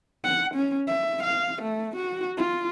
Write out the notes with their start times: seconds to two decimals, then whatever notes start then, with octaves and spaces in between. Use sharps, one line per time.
0.24 F#5
0.54 C#4
0.87 E5
1.23 F5
1.62 A3
1.96 F#4
2.37 F4